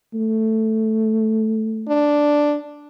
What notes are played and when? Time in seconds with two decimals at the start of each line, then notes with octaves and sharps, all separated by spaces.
0.14 A3
1.89 D4